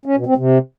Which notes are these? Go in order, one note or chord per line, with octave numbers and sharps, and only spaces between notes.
C#4
B2
C4
C3